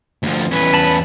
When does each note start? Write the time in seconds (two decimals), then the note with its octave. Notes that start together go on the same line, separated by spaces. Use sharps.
0.23 D2 F3
0.51 E2 C#4 B4
0.74 A5 B5